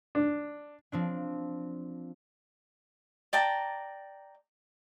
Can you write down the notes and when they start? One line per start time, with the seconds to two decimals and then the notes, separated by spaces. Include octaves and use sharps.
0.15 D4
0.92 F3 C4 D4
3.33 D5 G5 A5 A#5